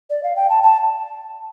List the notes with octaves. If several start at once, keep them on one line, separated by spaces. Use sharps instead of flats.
D5
F5
G5
A5
A5